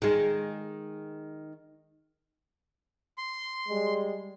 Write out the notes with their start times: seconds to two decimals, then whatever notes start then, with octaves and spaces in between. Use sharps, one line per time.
0.02 D#3 G#3
3.18 C6
3.69 G3 G#3